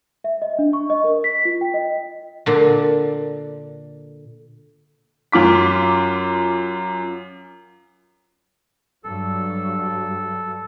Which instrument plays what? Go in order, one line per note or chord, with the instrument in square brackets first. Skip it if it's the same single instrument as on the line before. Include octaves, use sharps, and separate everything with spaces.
[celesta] E5
D#5
D4
C#6
D#5
A#4
B6
F4
G5
D#5
[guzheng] A#2 D3
[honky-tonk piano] F#2 F4 D6 B6
[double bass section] G2 F#3 [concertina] A4